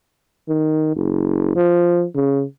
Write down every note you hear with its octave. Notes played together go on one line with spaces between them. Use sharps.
D#3
F#1
F3
C#3